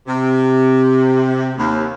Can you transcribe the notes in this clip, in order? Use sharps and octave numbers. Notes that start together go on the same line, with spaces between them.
C3
D#2